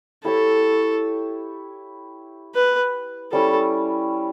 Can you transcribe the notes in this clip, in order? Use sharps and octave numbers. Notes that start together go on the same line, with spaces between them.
E4 G4 A4 C#5 E5
B4
G3 C#4 E4 A4